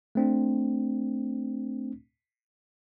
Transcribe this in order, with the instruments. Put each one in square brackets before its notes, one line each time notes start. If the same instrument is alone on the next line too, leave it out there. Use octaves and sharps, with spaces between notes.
[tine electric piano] A3 C4 D4